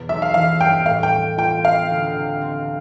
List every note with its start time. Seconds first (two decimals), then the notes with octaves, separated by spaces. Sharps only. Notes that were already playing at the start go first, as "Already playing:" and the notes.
Already playing: E2 B2
0.09 B1 E5
0.22 F5
0.34 E3 F5
0.60 G2 G5
0.86 A2 F5
1.03 G5
1.12 A3
1.38 F4 G5
1.64 C4 F5
1.90 D2
2.16 C3
2.41 C4